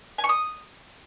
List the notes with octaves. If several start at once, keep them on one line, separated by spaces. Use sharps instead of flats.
G#5
C#6
D#6